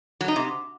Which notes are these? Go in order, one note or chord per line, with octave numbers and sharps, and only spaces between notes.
F#3
D#4
C3